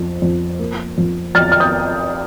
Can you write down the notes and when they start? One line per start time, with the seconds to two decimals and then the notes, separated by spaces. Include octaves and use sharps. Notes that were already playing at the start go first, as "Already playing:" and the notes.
Already playing: F2
0.22 F2
0.59 A#3
0.98 F2
1.35 F2 F6 A6
1.52 F6
1.60 D#6 G6